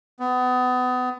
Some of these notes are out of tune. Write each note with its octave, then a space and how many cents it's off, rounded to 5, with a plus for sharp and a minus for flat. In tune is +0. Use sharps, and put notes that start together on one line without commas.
B3 +30